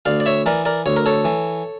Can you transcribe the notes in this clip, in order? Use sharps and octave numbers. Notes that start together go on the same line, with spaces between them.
D2 D5 F5
D5
C#5 E5
E3 A#4 D5
A#4 D5
D2 C#5
A#4
A4 C#5
E3